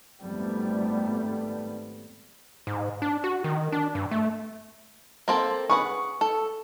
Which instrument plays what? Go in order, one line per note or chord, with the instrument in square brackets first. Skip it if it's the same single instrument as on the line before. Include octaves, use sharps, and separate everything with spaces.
[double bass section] G#1 F2 G3 A3 B3
[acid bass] G#2
D4
F#4
D#3
D4
G2
A3
[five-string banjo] A#3 C4 A4
[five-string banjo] G#4 B4 F#5 [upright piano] C#6
[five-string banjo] A4